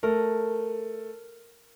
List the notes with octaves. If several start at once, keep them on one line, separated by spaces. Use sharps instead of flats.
A3 A#4